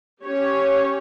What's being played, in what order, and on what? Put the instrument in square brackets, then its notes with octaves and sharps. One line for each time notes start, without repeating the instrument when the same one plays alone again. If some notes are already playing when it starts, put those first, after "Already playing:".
[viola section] C#4 G4 C#5